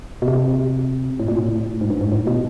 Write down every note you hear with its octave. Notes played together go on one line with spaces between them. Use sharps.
B2
C3
A2
A#2
A2
G#2
G2
G#2
A2
B2